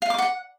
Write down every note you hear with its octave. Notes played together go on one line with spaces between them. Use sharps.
F5
D6
F#5